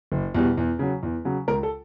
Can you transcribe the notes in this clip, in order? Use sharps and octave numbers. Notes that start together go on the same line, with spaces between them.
F#1
E2 B2 G3
E2
C#3 F#3
E2
C#3 F#3
C#2 A#4
A4